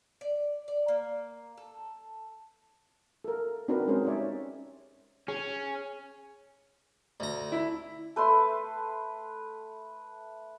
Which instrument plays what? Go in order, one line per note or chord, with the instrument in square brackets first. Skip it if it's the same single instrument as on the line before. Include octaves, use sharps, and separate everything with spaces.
[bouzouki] D5
D5
A#3
A4
[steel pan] A4 A#4
C4 D4 D#4 F#4 A#4 B4
G#3 C#4 G#4 A#4 C5
C#4 D#4 G4 C#5 D5 E5
[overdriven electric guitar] C#4 [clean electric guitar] G#4
[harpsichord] D2 A#5
[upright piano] E4
[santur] A3 B4 C5 C6